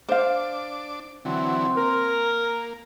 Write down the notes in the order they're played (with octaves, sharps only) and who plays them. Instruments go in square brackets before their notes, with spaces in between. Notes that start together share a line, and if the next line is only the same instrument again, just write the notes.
[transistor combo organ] D4 D6 [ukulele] C5 F5
[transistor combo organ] D3 E3 F#3 [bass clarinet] C4
[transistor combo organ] A#3 [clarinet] A#4